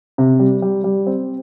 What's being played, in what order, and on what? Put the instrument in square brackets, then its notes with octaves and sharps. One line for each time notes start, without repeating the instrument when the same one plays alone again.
[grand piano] C3
G3
G3
G3
C4